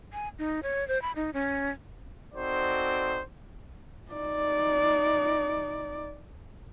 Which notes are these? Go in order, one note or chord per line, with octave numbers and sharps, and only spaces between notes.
G#5
D#4
C#5
C5
B5
D#4
C#4
C4 D#4 F#4 A4 C5 D5
D#4 D5